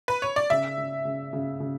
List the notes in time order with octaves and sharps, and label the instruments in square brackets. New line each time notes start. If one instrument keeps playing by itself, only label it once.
[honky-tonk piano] B4
C#5
D5
[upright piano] C#3 [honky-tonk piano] E5
[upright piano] C#3
C#3
C#3
C#3